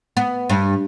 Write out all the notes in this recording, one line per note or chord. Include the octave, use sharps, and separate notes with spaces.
B3
G2